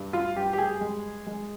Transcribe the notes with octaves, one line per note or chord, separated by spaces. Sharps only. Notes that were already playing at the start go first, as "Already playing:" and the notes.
Already playing: G2
F4
G2 G4
G4
G#4
G#3
G#3